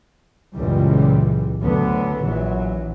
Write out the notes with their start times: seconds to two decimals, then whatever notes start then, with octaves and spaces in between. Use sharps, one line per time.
0.54 C#2 F#2 A#2 E3 G3
1.63 D2 D3 F#3 B3
2.21 A#1 E3 F#3